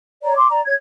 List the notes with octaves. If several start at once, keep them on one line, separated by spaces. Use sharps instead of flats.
C#5 D5 A#5
C6 D6
D5 A#5
C#5 G#6